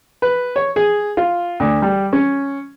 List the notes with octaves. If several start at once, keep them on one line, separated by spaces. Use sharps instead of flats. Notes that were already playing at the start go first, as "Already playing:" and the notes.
B4
C#5
G#4
F4
D2
G3
C#4